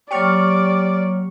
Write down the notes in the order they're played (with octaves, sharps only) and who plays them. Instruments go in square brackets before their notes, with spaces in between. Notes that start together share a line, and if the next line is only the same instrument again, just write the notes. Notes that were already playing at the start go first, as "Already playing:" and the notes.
[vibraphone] F#3 A#3 C#5 [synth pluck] G4 C#6 F6 [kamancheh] D5